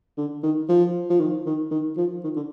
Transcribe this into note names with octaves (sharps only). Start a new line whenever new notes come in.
D3
D#3
F3
F3
D#3
D#3
D#3
F3
D#3
D3